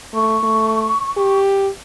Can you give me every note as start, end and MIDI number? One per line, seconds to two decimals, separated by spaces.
0.14 0.37 57
0.14 1.38 85
0.43 0.93 57
1.17 1.69 67